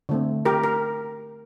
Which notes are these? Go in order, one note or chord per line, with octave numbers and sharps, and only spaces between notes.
D3 A3 C4
G4 A#4
A#4